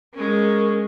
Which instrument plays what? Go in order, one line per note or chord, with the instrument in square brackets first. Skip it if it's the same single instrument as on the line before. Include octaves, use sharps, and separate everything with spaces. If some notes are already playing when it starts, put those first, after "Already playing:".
[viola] G#3 C#4 [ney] A#4